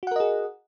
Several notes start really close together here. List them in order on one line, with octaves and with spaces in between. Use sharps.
F#4 F#5 A#4 D#5 G#4